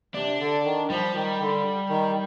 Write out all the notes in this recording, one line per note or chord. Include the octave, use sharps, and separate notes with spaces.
C3 D4
D3
D#3
F3 G3
D#3
D3
D#3